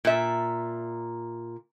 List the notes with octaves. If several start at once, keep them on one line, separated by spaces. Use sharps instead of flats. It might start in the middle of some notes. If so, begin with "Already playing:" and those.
A#2 E5